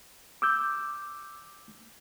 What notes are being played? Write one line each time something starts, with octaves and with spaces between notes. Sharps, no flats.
D6 E6 G6